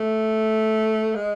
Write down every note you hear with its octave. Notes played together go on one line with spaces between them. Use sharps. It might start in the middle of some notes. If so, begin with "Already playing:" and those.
Already playing: A3
G#3